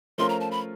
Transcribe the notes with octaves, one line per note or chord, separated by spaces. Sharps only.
F3 A3 C#4 F4 A#4 C6
A#5
A5
B5